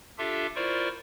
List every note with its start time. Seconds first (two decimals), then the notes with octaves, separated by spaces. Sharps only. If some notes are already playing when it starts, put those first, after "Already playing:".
0.18 D4 F4 G4 A4 E5
0.55 E4 F4 A#4 C5 D5 C#6